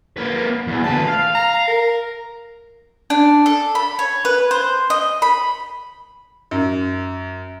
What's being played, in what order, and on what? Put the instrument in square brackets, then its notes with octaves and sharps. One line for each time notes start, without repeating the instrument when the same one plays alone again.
[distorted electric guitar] A#3 B4
E2
[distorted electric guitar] D2 B4 [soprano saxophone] A5
[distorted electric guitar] F5
[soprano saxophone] A#5
A#4
[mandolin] D4
A4
B5
C#5
B4
C5
D#5
B5
[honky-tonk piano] F#2